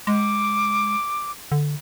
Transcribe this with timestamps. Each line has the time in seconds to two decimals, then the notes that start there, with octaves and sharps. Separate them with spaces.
0.07 G#3 D6
1.52 D3